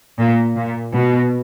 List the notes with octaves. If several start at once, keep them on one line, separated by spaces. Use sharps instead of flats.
A#2
A#2
B2